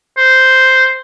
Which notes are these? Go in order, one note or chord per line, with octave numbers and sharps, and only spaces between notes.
C5